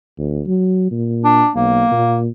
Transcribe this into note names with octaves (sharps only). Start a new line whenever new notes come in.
D2
F#3
A#2
D4
B1 A#3
A#2